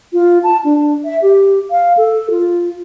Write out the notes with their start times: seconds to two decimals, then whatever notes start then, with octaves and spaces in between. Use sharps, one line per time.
0.13 F4
0.43 A5
0.64 D4
1.04 E5
1.22 G4
1.71 F5
1.97 A4
2.31 F4